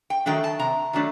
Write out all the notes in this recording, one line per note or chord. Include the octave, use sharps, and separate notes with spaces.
G5
D#3 F#3 A3 D4 G5
A5
C3 A#5
D#3 F#3 A3 D4